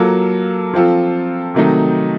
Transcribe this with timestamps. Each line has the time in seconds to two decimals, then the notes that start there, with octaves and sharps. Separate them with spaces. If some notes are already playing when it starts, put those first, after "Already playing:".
Already playing: F#3 A#3 F4 A4
0.73 F3 C4 F4 A4
1.54 C3 D#3 F#3 A3 D#4